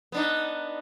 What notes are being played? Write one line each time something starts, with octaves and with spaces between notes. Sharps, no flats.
B3 D4 D#4